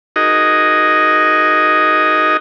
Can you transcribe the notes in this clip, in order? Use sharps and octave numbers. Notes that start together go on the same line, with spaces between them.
D#4 F#4 G#4 A#4 D#5